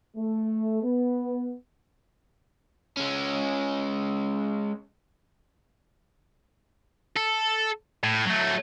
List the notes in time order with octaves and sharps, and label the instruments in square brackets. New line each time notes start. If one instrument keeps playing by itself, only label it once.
[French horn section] A3
B3
[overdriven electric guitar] G#3 C#4
[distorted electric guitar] A4
A2
F#3 A3